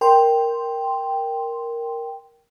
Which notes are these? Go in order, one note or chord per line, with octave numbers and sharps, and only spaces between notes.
A#4 G5 C6